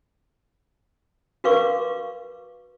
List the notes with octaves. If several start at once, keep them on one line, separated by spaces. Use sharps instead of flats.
F#4 A#4 B4 F5 C#6 D6